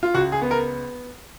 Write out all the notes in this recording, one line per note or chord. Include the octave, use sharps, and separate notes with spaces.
F4
C#2 F#4
G#4
B3
A#4